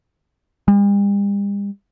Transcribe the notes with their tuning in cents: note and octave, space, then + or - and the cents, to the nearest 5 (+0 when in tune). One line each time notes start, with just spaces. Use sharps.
G3 +45